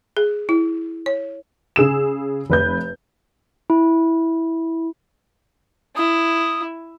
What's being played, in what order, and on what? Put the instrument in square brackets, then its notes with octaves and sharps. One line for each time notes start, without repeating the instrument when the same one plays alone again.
[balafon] G#4
E4
C#5
[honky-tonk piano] C#3 G#4 E6 E7
F1 B4 G6
[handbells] E4
[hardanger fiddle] E4 [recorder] D#6